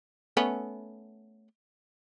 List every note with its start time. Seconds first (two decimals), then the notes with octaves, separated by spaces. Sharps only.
0.37 A3 B3 C#4